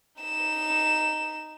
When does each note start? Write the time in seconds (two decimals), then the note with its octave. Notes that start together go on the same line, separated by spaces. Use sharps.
0.22 D#4 E7